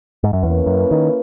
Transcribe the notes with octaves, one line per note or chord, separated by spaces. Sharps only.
G#2
F#2
E2 A#3 C#4 E4 B4
F#2
D#3